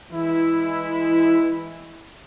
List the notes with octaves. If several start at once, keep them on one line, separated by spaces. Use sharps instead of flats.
E3 G#3 E4